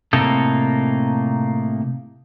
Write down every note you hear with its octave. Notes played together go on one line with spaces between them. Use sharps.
A2 C3 A#3 D#4 A4